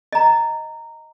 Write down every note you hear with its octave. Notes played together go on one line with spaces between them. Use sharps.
D#5 A#5